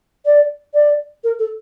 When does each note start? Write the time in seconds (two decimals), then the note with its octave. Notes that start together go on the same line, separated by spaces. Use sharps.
0.25 D5
0.73 D5
1.23 A#4
1.39 A4